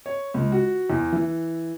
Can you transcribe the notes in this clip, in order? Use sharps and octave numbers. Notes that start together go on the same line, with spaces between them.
C#5
C#2
F#4
E2
E3